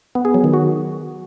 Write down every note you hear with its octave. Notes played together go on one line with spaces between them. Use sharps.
B3
G#4
F#3
D#3
F#4